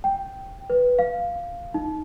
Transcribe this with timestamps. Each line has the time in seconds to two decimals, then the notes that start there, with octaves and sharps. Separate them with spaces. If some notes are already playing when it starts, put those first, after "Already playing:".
0.04 G5
0.70 B4
0.99 F5
1.74 D#4